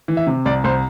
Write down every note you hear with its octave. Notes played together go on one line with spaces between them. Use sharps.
E3
E5
C3
C2 D5
C2 C5